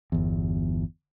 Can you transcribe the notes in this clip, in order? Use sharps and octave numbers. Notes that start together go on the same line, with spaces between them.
G1 E2